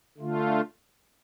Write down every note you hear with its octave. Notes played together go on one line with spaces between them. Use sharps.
D3 A3 F4